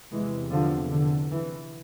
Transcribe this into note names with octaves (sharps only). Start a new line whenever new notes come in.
E2 C3 E3 G#3
D3 F3
D3
E3